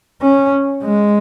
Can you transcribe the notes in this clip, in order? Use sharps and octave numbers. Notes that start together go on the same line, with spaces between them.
C#4
G#3